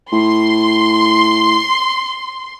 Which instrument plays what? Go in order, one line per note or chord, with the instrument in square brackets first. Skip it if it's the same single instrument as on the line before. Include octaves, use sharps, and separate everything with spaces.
[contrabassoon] A2 [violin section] C6